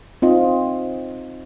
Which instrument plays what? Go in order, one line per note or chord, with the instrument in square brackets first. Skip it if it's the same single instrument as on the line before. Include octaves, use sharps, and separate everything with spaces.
[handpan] C4 D#4 F4 D#5